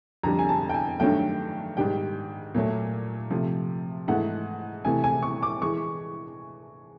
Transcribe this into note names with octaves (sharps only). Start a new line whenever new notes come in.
F2 D3 G3 A#5
G#5
A5
G5
G#5
G2 D#3 F#3 A3 G5
G#2 D#3 G3 G5
A#2 F#3 A3
C3 F3 A3
G#2 E3 A3 F#5
C3 E3 A3 G#5
G#5
C#6
D6
E3 G#3 C#6